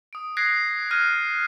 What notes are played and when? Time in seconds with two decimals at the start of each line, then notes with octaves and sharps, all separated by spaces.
0.13 D#6 D7
0.37 D#6 F#6 G#6 A#6 C7 D7
0.91 F6 F#6 G#6 A#6 D#7